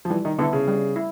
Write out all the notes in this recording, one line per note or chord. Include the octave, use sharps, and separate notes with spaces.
F3
E3 G3
D#3
D3 B3 E4
C#3
G3
E4